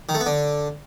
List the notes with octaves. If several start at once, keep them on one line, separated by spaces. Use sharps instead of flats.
D#3
A3
B3
D3